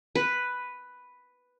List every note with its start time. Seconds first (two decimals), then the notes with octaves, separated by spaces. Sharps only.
0.15 B4